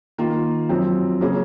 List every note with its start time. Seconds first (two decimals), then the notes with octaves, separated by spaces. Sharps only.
0.18 D#3 A#3 F4
0.69 F#2 F3 C4
1.21 C#3 F#3 A#3 C#4 G#4